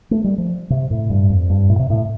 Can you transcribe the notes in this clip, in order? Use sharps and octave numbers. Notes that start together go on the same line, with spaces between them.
A3
G3
F3
C3
A2
G2
F2
G2
A2
C3
A2